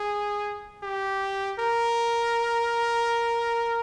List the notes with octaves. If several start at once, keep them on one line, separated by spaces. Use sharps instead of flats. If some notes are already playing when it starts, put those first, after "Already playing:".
Already playing: G#4
G4
A#4